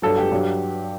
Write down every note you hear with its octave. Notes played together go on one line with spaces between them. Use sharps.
G2 F#3 A4
G4
G2 F#3